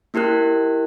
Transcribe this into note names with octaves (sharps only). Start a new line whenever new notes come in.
A#3 E4 G4 A#4 F#6